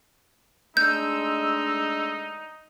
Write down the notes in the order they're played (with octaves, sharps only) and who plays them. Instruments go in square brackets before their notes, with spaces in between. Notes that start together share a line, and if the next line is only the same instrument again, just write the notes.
[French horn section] G#3 A3 D4 [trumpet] D#4 [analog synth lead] E6 [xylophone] G6